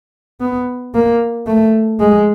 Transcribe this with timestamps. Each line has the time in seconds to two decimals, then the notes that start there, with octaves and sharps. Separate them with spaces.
0.41 B3
0.94 A#3
1.47 A3
2.00 G#3